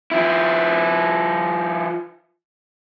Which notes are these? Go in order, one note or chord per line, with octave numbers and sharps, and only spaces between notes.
F3 E4